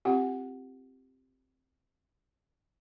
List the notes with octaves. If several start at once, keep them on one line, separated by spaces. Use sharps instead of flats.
C4 F4 G4 F#5